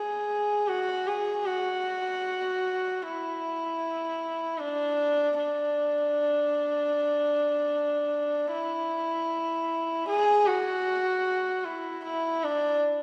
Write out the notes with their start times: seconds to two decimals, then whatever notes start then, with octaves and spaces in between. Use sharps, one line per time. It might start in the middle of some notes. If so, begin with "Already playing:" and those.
Already playing: G#4
0.68 F#4
1.07 G#4
1.46 F#4
3.03 E4
4.59 D4
5.38 D4
8.52 E4
10.08 G#4
10.47 F#4
11.65 E4
12.04 E4
12.44 D4